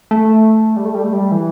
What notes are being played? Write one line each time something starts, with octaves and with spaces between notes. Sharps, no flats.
A3
G3
A3
G3
A3
G3
E3